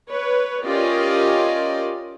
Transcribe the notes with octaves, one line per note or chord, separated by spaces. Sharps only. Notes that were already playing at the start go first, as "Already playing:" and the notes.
B4 C#5
C#4 F4 G4 A#4 D5 D#5